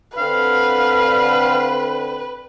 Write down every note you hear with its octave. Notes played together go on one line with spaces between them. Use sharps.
D3 C4 B4 F5